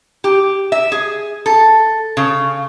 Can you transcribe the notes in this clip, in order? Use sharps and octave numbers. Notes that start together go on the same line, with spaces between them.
G4
E5
G#4
A4
C#3